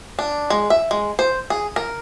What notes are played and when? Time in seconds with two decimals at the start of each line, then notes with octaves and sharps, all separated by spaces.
0.19 D4
0.50 G#3
0.70 E5
0.91 G#3
1.19 C5
1.50 G#4
1.76 A#4